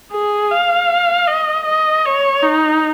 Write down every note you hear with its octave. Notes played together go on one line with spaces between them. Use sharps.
G#4
F5
D#5
D#5
C#5
D#4